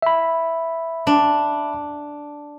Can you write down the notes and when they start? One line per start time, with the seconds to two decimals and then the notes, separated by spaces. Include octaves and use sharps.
0.02 E5 B5
1.07 D4